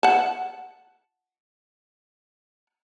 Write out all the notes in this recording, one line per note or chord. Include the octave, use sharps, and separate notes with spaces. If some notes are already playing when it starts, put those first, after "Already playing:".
F#5 A5